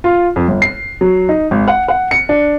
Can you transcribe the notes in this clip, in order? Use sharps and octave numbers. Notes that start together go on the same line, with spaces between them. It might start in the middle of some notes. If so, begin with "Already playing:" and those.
F4
F2
G1
C7
F#3
D#4
G#1
F#5
F#5
C#7
D4